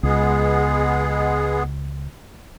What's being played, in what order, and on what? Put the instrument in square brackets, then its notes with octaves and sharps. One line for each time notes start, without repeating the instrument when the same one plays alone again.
[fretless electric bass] C#2 [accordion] G#3 B3 G#4